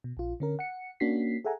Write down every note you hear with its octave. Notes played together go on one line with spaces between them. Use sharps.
B2
A#1 F4
D3 C#4 A#4
F#5 C#7
A#3 C#4 D4 F#4 B6 C7
G#4 A4 E5 F#5 G#5 A#5